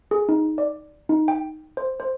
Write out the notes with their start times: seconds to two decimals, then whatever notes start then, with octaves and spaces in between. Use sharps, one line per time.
0.11 G#4
0.29 D#4
0.58 D5
1.09 D#4
1.28 G5
1.77 C5
2.00 C5